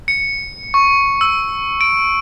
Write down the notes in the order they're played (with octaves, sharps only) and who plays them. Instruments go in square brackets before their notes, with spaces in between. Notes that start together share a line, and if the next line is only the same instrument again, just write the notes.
[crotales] C#7
C#6
E6
D7